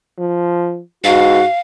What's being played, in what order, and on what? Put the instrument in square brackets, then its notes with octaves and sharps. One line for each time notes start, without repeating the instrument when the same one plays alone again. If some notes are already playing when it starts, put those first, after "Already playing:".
[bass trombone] F3
[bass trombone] G#2 [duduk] F#4 [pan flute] F5